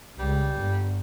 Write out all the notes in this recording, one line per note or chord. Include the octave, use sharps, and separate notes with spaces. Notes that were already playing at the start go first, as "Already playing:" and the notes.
C#2 G3
G1